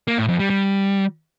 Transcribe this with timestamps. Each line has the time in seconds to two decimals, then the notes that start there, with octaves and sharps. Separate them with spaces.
0.08 A#3
0.18 A2
0.29 F2
0.39 G3
0.50 G3